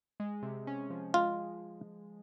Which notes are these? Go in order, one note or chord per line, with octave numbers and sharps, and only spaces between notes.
G#3
C3
C#4
F3
G#3 F4